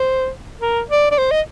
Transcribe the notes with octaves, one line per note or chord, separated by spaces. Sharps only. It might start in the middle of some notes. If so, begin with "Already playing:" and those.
Already playing: C5
A#4
D5
D5
C5
D#5